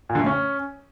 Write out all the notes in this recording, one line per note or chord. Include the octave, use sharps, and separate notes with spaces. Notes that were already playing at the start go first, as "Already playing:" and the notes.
A#2
D3
A3
C#4